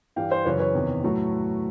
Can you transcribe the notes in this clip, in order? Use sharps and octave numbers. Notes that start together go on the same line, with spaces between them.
G2 E3 G3 F5 G5
C5 D5
F#2 C#3 E3 B4 C#5
B4 C#5
E2 C3 D#3
A2 F#3 A3